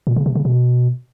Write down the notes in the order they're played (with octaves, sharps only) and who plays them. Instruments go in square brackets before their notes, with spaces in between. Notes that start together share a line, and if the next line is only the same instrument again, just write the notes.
[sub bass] A#2
C#3
C3
C#3
B2